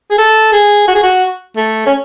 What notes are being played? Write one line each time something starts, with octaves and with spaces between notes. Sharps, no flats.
G#4
A4
G#4
F#4
G#4
F#4
A3
C#4